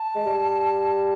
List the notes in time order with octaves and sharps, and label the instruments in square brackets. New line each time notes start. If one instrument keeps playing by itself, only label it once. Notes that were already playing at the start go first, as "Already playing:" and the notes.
Already playing: [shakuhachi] A5
[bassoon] G#3
G3